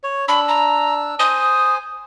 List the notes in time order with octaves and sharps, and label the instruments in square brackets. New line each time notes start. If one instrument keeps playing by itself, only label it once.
[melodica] C#5
[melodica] D4 E6 [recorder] B5
[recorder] A#5
[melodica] C5 G#5 [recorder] D#6